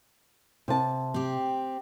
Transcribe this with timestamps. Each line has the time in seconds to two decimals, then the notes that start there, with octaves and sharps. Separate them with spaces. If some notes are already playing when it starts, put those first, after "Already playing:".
0.68 C3 A5
1.14 C4 G4